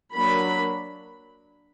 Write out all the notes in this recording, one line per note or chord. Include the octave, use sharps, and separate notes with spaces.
F#3 A#3 D4 B5